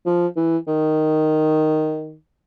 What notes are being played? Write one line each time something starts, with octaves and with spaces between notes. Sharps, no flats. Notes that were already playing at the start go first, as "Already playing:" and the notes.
F3
E3
D#3